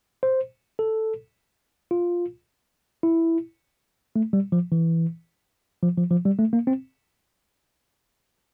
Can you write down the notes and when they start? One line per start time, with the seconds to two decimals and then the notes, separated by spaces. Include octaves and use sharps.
0.23 C5
0.79 A4
1.91 F4
3.03 E4
4.16 A3
4.33 G3
4.52 F3
4.72 E3
5.83 F3
5.98 F3
6.11 F3
6.25 G3
6.39 A3
6.53 A#3
6.67 C4